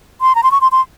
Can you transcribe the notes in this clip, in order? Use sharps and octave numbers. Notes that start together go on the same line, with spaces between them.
C6
A#5
C6
C#6
C6
C6